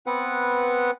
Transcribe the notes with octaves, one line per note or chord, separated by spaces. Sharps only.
B3 C4 B4 F#5